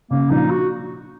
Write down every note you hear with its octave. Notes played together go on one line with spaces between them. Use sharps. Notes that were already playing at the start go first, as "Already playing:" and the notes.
C#3 A#3
A#1 D#4
F#4